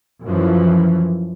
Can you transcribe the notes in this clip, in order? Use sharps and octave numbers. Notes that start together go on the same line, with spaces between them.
F#2 E3 F3